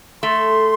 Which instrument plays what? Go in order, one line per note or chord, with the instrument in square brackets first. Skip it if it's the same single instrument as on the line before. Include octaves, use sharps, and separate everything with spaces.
[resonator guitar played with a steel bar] A3 [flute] C6